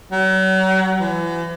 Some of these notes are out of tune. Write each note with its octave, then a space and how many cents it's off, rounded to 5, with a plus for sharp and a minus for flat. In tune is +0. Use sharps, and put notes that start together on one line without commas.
F#3 +35
E3 +40